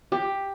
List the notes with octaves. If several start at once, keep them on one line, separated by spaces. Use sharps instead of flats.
G4